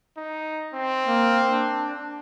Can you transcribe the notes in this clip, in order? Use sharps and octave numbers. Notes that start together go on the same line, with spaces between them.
D#4
C4
A#3
D4